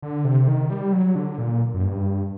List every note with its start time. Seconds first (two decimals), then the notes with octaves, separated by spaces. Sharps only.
0.02 D3
0.25 C3
0.48 D#3
0.70 G3
0.93 F#3
1.15 D3
1.38 A#2
1.74 F#2
1.84 G2